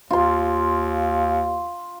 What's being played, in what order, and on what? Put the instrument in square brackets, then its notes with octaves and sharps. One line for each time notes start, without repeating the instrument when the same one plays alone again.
[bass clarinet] D#2 [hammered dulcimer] F4 C6